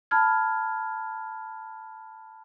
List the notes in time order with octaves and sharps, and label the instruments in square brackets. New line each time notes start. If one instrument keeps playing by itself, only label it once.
[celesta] A5 B5 F6 G#6